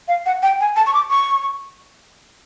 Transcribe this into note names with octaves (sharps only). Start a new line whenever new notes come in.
F5
F#5
G5
G#5
A5
C#6
D6
C#6